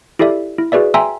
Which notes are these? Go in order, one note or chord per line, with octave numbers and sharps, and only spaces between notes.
E4 G4 A4 D5 E5
E4
F#4 G#4 B4 D5 E5
E5 G5 G#5 A#5 C6 E6